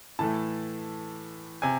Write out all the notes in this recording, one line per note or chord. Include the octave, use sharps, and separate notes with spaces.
A2 E3 A3 A5
C3 G#5